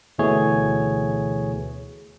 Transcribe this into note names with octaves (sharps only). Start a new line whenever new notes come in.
D2 B2 E3 A3 G#4 C#5